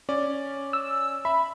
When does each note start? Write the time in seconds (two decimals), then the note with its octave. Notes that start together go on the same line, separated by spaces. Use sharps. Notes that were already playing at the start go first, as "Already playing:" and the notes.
0.09 C#4 D5
0.73 E6
1.25 E5 B5